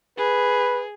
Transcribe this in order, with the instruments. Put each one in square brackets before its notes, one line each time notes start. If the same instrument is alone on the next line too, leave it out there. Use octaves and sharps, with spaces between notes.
[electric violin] G#4 [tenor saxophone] B4